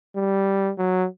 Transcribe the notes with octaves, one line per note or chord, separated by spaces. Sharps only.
G3
F#3